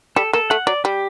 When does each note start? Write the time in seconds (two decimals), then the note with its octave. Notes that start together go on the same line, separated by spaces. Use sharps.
0.16 G3 A4
0.33 A#3 A4
0.50 A3 F#5
0.67 F#3 D5
0.84 G3 G4